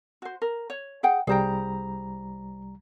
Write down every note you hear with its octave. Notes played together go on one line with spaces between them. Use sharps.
F#4 C5
A#4
C#5
G#4 F#5 G5
C2 G3 G#4 C5 G5 A#5